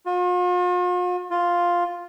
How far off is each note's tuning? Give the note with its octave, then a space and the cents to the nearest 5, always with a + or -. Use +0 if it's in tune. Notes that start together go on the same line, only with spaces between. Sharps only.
F4 +45
F4 +5